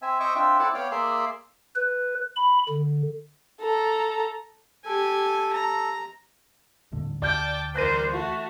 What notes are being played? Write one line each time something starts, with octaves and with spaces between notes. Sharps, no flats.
C4 E5 G#5
C5 D#5 E5 C#6 D6
C4 D4 F4 E5 G5
C4 E4 A4 D5 F#5 A5
B3 C#5 D5 F5 G5
A#3 G#4 D5 E5 C6
B4
B5
D3
A4 A#5
G4 A4 G#5
A#5
D#1 A1 D3
D2 D5 G5 A5 D6 F6 G6
E3 G3 A#4 C5 F#6 A#6 D#7
A3 F#4